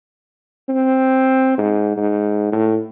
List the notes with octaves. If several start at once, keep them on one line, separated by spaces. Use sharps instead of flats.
C4
G#2
G#2
A2